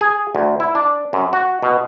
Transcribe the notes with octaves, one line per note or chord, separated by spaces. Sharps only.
G#4
D2
E4
D4
F#2
F#4
B2